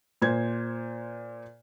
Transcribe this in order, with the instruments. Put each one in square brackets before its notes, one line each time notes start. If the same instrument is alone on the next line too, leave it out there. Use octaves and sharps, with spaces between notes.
[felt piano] A#2 C5 G#6